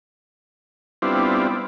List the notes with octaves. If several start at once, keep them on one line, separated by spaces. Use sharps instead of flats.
G3 B3 C4 D4 E4 F4